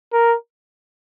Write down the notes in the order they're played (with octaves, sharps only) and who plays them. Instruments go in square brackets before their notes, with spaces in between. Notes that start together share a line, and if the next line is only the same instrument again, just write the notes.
[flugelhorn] A#4